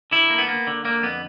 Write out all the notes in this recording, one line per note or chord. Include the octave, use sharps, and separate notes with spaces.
D3 E4
A#3
B3
A#3
D3
D3 A#3
F2 B3